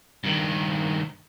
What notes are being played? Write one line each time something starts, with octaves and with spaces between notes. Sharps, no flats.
G2 D#3